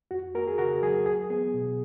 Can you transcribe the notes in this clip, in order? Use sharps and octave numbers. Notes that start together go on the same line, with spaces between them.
F2 F#4
A#3 F#4 A#4
G#4
C#3 F#4 A#4
F#3 G#4
C#2 G#4
B3 G#4
B2